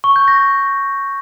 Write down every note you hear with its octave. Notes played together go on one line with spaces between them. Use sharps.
C#6
G6
A#6